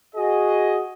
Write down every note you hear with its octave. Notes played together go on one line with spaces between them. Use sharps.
F#4 G#4 D#5